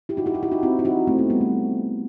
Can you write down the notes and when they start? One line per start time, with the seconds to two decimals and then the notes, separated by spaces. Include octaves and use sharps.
0.09 E4 G4
0.17 D#4 F#4
0.26 E4 G4
0.34 D#4 F#4
0.43 E4 G4
0.52 D#4 F#4
0.63 C4 E4
0.79 E4
0.85 D#4 F#4
1.07 A3 C4
1.19 B3 D#4
1.30 G3 B3
1.41 A3